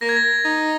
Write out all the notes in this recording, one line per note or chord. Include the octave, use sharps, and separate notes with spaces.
A#3 A#6
G#6
A#6
D#4